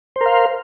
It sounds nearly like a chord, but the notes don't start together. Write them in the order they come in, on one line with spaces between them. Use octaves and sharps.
C5 A#4 F5